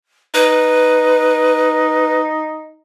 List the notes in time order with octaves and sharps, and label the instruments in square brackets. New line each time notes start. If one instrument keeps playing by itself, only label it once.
[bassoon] D#4 [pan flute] B4